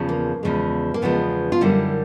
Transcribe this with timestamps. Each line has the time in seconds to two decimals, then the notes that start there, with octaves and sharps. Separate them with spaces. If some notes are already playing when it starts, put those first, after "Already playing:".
Already playing: E2 C#3 F3
0.09 A#3
0.43 E2 C#3 F3 G#3
0.94 A#3
1.02 E2 C#3 F3 G#3 B3
1.52 F4
1.61 F#2 D3 G3 A#3 E4